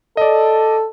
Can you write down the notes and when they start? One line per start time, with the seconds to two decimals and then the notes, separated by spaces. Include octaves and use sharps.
0.17 A4 D5 D#5